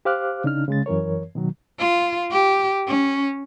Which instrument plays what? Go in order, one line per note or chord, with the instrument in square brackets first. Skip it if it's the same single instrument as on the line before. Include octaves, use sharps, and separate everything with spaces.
[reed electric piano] G4 C5 F5 D6 F6 F#6
C#3 D4 D#4 F6
C#3 G#3 A6
F#2 E3 A#4 C#5
B2 D#3 F#3
[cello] F4
G4
C#4